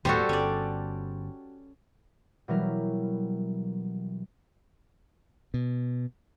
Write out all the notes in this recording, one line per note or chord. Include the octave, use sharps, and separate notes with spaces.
D#1 A2 G3 B3 F#4 G4 A4 C5
G1 C#4 D5
B2 E3 F#3 G3 E4 A#4
B2